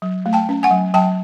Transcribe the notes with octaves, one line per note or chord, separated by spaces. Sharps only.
F#3
A3
G5 A5
C#4
F#5 G#5
F#3
F#3 G5 A5